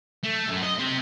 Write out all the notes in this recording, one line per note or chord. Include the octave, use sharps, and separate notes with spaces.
A3
F#2
D#5
C4 G4